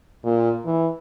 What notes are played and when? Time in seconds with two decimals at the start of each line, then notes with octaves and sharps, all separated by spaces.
0.24 A#2
0.65 E3